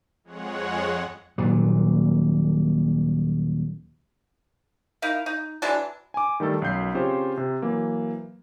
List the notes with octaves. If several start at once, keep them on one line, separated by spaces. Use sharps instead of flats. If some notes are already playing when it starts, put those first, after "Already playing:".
F2 G#3 C#5 F#5
D#1 A#2 F#3
D#4 E4 A#4 F5
D#4
E3 F#3 G#3 D4
G#5 D6
D#3 G3 A3 A4
B1 F#2 G6 C7
C#3 C4 F4 G4 C5 C#5
C3
E3 F#3 A#3